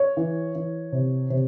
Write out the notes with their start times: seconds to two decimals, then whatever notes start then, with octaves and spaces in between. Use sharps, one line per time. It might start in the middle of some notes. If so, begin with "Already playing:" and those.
Already playing: C#5
0.17 E3
0.55 E3
0.92 C3
1.30 C3